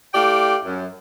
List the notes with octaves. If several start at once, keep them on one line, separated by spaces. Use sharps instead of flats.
A3 E4 G4 D5 F5 G5
F#2